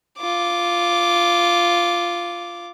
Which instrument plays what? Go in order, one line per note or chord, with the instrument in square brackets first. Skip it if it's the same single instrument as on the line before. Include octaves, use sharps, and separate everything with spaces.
[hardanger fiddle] F4 D6